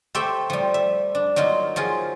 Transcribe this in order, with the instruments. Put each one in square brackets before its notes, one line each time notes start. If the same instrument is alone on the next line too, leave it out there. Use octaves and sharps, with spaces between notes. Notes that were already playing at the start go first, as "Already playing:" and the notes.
[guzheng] A3 G4 A4 C5 E5 G5
F3 G3
E5
D4
F#3 A#3 D#4 F4
F3 F#3 F4 G#4